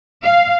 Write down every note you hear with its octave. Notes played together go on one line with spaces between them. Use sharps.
F5